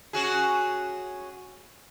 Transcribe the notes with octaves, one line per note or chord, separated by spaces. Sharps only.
C#4 F#4 G#4